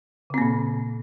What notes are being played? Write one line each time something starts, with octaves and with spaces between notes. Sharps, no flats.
A#2 C#3 A#3 C4